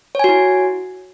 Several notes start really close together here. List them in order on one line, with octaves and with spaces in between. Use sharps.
C#5 G#5 F#4 E4